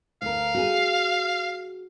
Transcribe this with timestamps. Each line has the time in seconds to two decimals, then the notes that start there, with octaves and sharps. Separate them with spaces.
0.22 D2 A#4 F5
0.55 F#4 G#4